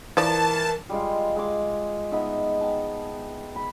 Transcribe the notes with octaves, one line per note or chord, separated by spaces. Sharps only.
E3 F3 A#4 D5 A5
G3 G#3 F4
G#3 D6
B3 D#4 E5
G5 A5
B5